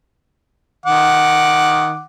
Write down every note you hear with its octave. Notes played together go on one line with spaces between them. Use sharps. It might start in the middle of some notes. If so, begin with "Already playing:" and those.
D#3 F#5 D6